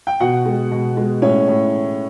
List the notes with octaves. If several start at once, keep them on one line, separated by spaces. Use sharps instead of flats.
G5
B2 F#4 F#5
G#3
B2
G#3
A2 C#4 C#5
A2